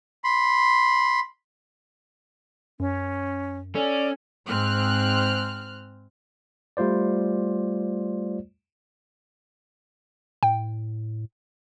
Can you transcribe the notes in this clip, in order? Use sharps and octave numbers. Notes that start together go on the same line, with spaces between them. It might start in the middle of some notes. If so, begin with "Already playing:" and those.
B5 C6
F#2 C#4
C#4 A4 D5
G#2 C4 F6 F#6
G3 A3 F4 C5 D5
A2 G5